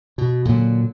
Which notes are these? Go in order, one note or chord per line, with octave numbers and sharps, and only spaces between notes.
B2
A#2 D3 F3 F#3